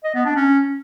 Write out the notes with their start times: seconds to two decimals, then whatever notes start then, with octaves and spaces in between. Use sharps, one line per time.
0.04 D#5
0.15 B3
0.26 D4
0.36 C#4